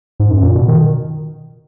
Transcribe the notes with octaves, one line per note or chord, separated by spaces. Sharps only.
G#2
F#2
A#2
B2
D#3